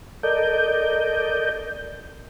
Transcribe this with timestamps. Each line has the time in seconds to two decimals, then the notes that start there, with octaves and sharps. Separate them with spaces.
0.23 A4 A#4 D5 D#5 G6